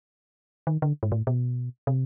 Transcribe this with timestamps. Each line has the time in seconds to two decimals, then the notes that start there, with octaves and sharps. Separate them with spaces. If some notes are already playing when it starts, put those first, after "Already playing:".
0.67 D#3
0.82 D3
1.03 G#2
1.12 A2
1.27 B2
1.87 C3